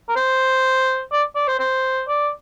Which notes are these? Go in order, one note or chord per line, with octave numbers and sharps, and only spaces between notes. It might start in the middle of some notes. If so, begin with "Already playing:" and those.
A#4
C5
D5
D5
C5
C5
D5